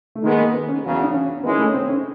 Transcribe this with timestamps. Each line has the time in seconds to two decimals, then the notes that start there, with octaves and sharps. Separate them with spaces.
0.15 A3
0.23 D#3 G#3 A#3 B3
0.38 A#3
0.53 B3
0.69 C#4
0.84 E2 C#3 F#3
1.03 D4
1.14 C#4
1.44 D#3 G#3 B3 C#4 E4
1.59 A3
1.74 C4
1.89 C#4